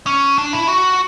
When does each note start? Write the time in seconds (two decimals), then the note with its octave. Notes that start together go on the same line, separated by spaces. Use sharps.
0.07 C#4
0.38 D4
0.53 E4
0.69 F#4